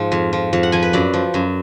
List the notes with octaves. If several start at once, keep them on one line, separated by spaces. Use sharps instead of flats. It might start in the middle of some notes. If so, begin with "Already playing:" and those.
Already playing: G#2 F3
F2
F3
F2
F#5
F3 G#5
B4
F#2 D5
F3
F#2